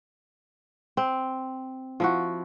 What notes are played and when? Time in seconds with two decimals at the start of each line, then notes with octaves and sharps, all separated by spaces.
0.97 C4
2.00 F3 E4 F#4